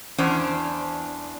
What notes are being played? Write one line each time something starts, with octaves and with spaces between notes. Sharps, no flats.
E2 C#4 D4 C5